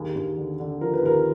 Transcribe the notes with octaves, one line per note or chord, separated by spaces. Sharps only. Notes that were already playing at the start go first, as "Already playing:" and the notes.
Already playing: D#2 G#4
D#2
D3
D3
F3 A#4
B4
D#2 A#4